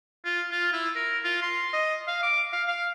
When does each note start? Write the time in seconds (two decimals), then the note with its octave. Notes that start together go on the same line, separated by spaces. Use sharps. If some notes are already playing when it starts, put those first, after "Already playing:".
0.25 F4
0.51 F4
0.73 E4
0.96 A#4
1.24 F4
1.42 C6
1.73 D#5
2.08 F5
2.23 D6
2.53 F5
2.68 F5